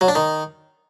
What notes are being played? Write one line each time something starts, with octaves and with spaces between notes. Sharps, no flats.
F#3
D4
D#3